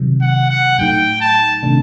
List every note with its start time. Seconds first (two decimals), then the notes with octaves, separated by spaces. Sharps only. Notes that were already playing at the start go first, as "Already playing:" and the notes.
Already playing: C3 D#3 F#3
0.22 F#5
0.50 F#5
0.78 A2 F#3 A3 D#4 G5
1.21 A5
1.63 C3 D#3 A3 D4